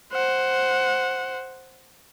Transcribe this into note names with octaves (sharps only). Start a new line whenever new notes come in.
C5 F#5